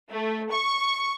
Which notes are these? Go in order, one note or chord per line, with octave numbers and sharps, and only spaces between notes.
A3
C#6